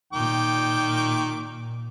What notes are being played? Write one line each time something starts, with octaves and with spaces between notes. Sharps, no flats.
A#2 D#3 G5 D6